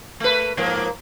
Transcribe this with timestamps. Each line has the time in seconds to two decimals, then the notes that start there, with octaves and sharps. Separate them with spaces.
0.20 A3 B4
0.57 G#2 F3 A#3